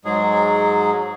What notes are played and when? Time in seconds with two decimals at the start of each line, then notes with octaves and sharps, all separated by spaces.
0.05 G#2 F#3 G#3 G#4